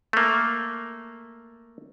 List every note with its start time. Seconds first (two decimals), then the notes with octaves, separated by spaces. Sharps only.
0.13 A3 A#3